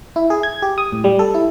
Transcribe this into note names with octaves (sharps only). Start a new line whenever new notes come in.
E4
G#4
G#6
G4
D#6
A2
G3
A4
E4